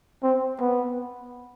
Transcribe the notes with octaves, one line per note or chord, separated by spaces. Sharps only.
C4
B3